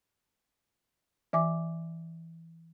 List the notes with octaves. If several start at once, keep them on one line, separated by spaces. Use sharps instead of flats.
E3 E5 G#5 D6